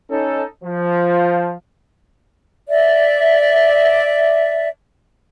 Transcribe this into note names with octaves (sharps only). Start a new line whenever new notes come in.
C#4 D#4 A4
F3
D5 E5